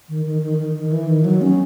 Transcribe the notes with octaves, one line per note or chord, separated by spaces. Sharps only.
D#3
D#3
D#3
D#3
D#3
E3
D#3
F#3
C#4